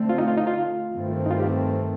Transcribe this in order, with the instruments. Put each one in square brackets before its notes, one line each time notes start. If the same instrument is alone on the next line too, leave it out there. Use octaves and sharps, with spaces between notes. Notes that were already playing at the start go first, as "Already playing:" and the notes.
Already playing: [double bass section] D3 A3 C4
[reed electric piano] F4
D#4
F4
D#4
F4
[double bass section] G2 D#3 A3 C4
[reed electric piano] D#4
F4
G4